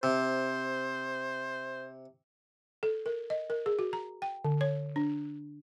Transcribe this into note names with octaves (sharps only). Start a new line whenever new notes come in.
C3 C5
A4
A#4
D#5
A#4
G#4
F#4
A#5
G5
D3
C#5
D4